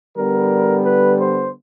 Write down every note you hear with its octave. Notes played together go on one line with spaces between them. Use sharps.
D3 G3 B3 A#4
B4
C5